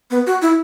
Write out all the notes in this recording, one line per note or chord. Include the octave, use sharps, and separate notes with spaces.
B3
F#4
E4